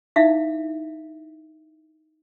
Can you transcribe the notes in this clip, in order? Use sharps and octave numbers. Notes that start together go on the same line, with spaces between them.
D#4 E4 E5 F5